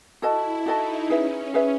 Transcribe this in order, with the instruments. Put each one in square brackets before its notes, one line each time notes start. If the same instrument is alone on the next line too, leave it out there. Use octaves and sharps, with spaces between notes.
[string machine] E4 [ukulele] F#4 A4 D#5 A5
[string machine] D#4 [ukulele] F#4 A4 D#5 A5
[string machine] C#4 [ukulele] G#4 B4 E5
[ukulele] G#4 B4 E5